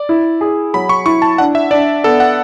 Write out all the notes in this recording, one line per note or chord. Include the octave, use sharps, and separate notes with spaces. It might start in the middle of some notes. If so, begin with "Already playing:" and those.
Already playing: D5
E4
G#4
F#3 B5
C#6
E4 C#6
A5
D4 F#5
E5
D4 D5
B3 A4
F#5